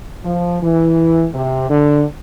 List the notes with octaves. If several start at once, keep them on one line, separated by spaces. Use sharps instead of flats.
F3
E3
C3
D3